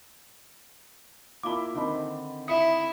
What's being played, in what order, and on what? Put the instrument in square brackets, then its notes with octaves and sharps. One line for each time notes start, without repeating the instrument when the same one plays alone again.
[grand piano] A#3 E4 G7 [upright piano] F4 B5 [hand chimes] D6
[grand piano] D3 D#3 C4 [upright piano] D#4 D#5 B5
[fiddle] E4 [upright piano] E5 C#7 [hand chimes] D#6